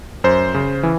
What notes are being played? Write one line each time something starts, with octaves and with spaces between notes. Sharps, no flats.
F#2 C5
C#3
E3